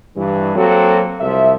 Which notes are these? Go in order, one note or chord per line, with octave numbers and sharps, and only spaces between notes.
G2 E3
F#3 A#3 C4 F#4 A4
C2 F3 E5